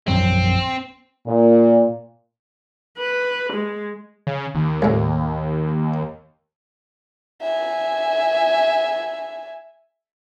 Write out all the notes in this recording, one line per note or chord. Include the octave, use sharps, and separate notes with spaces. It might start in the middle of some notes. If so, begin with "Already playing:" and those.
A#1 F#2 F#3 C4
A#2
B4
G#3
C#3
D#2
C2 A2
E5 G#5